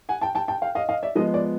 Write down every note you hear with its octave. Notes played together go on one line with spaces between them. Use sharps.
F#5 G#5
G5 A5
G5 A5
G5 A5
F5 G5
D#5 F5
D#5 F5
D5 E5
F3 G#3 B3 D#5
D5